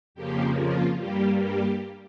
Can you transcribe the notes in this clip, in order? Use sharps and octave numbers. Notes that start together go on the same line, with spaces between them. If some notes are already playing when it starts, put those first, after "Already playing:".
F2 C#3 F3 A#3 G4
F4
G2 G3 A#3 G4
G4